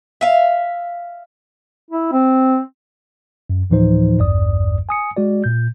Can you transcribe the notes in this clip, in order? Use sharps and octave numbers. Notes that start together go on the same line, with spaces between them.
E5 F5
E4
C4
F#2
D2 A2 E3 F3 D#4 C5
A1 E2 G2 D5 D#6
G#5 D#6 C#7
G#3 F#4 D5
A#2 G6